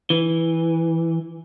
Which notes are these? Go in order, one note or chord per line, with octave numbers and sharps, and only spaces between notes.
E3